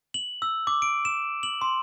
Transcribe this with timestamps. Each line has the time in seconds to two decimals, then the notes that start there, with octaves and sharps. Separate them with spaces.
0.14 F#7
0.42 E6
0.67 D6
0.82 D7
1.05 E7
1.43 F#7
1.61 C6